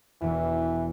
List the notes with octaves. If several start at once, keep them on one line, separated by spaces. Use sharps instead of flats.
E1 E2 E3